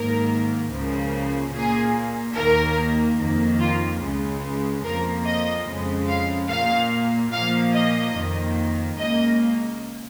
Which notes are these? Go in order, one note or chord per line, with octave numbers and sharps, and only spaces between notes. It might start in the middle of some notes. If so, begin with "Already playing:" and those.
Already playing: G#2 D#3 A#3 A#4
C#2 C#3 F3 A#3
A#2 A#3 G#4
D#2 D#3 A#3 A#4
F2 D#3 A#3
F4
C#2 C#3 G#3
F2 F3 A#3 A#4
D#5
F2 C#3 G#3
F5
A#2 A#3 F5
A#2 F3 A#3 F5
D#5
F2 D#3 A#3
C#2 C#3 A#3 D#5